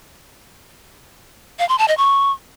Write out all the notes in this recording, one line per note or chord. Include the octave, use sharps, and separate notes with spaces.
F5
C6
A5
D#5
C#6